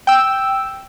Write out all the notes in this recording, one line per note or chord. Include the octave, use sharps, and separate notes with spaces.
G5 E6